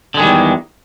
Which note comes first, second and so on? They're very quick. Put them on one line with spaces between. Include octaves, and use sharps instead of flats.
D3 G#3 D#3 G3 E2